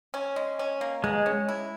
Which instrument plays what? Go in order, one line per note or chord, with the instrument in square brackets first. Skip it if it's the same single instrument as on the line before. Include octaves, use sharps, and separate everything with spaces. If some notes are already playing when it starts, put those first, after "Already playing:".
[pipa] C#4
G#3
C#4
A#3
[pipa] B2 [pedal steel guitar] G#3
[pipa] C#4
E4